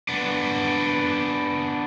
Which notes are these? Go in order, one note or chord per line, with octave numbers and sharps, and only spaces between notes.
B3 D4